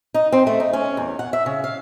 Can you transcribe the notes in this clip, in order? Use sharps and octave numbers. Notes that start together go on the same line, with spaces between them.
D#4
C4
A3
D#4
C#4
E2
F#5
E5
C#3
F5